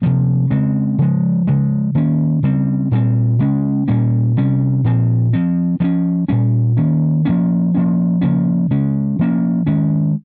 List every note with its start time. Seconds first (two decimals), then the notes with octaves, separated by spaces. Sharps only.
0.02 C3 F3 A#3
0.50 C#3 G#3 C4
0.98 C#3 F3 G#3
1.47 C#3 F3 G#3
1.95 D#3 A#3 C#4
2.43 C#3 G3 C4
2.91 A#2 G3 C4
3.39 C#3 G#3 C#4
3.88 A#2 G3 A#3 C#4
4.37 C3 G3 C#4
4.84 A#2 F3 C4
5.33 F3 C4
5.80 F3 A#3
5.84 C#4
6.28 A#2 G3 C#4
6.77 D#3 A#3 C#4
7.25 F3 A#3 C#4
7.74 F3 A#3 C#4
8.21 C#3 F3 A#3 C#4
8.71 C#3 G#3 C#4
9.19 F3 A#3 C#4
9.66 D#3 G#3 C#4